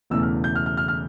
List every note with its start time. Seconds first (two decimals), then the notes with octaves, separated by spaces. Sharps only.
0.10 E1 E2 C#3 E3 A3 E6
0.22 F6
0.44 G6
0.55 F6
0.66 F6
0.77 F6
0.88 F6